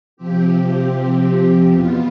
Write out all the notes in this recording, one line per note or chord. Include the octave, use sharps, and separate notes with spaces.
C3 F3 C4 G4
E2 B2 B3 F4